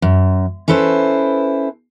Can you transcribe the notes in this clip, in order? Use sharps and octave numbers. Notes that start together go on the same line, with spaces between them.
F#2
C#4 E4 A4 B4 C5